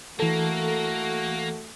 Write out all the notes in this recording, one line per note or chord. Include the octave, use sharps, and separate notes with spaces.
E3 A3 A#3 F#4 A4